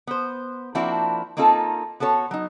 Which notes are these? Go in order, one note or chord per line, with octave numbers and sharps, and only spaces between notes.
B3 C5
F3 A#3 C4 D4 E4 F#4
A#3 C4 D#4 F4 A4
B3 F#4 A4 C5 C#5
F#3 D#4